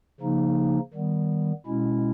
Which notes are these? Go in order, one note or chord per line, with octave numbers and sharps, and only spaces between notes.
C#3 F3 A#3 D#4
D#3 G3 B3
B2 G#3 C#4 E4